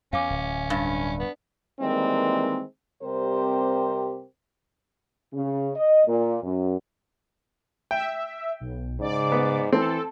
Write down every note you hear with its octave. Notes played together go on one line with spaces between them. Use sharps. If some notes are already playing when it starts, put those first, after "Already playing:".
E2 C#4 F5 G#5 D6
D1
G2
B3
D#3 E3 G3 G#3 A#3 C4
C3 G3 C4 G4 A#4 C5
C#3
D#5
A#2
F#2
E5 G5
B1
G#2 C#3 D5 D6
B3
E3 C4 A4